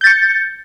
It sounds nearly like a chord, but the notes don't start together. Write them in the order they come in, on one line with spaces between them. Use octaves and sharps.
G6 A6 C#7